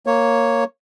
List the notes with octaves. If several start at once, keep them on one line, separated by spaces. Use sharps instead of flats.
A#3 C#5